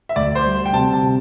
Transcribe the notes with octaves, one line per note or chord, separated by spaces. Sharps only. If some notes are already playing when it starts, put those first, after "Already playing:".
E5
D2 D5
C5
G3
G5
C3 A5
A5
C3